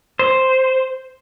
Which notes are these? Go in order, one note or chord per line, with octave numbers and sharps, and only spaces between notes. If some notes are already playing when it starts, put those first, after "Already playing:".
C5